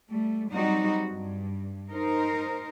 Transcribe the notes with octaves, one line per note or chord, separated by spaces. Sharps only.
G3 A3
F#3 G3 C4 D#4 F#4
G2
D#4 A#4 C5